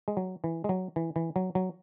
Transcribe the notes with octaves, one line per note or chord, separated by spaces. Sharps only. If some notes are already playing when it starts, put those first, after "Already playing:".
G#3
F#3
E3
G#3
F#3
E3
E3
F#3
F#3